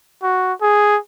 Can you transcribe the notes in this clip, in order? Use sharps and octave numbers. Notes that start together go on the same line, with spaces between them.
F#4
G#4